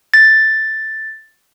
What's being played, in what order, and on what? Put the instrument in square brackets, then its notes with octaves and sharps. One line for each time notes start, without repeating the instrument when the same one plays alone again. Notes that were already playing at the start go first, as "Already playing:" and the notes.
[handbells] A6